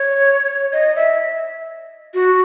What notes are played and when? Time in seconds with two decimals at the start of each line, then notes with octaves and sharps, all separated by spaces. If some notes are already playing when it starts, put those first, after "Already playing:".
Already playing: C#5
0.73 D#5
0.96 E5
2.14 F#4